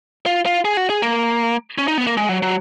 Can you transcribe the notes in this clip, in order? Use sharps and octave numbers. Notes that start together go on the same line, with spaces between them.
F4
F4
G#4
F#4
G#4
A#3
C#4
D#4
B3
A#3
G#3
F#3
F#3